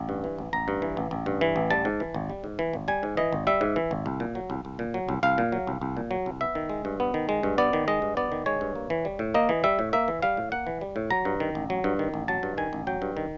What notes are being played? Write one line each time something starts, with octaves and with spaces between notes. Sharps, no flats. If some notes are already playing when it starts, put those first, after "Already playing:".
Already playing: A1
G2
E3
A1
A1 A#5
G2
E3
A1
A1
G2
E3
A1
G3 A5
G#2
E3
G#1
G3
G#2
E3
G#1
G3 G#5
G#2
E3 D#5
G#1
G3 E5
G#2
E3
G#1
C2
A#2
F#3
C2
C2
A#2
F#3
C2
C2 F5
A#2
F#3
C2
C2
A#2
F#3
C2
B3 E5
D#3
G#3
G2
B3
D#3
G#3
G2
B3 D5
D#3
G#3 D#5
G2
B3 D5
D#3
G#3 C#5
G2
A#3
E3
G3
A2
A#3 D#5
E3
G3 E5
A2
A#3 E5
E3
G3 F5
A2
A#3 F#5
E3
G3
A2
F#3 A#5
G2
D#3
A1
F#3
G2
D#3
A1
F#3 A5
G2
D#3 G#5
A1
F#3 G5
G2
D#3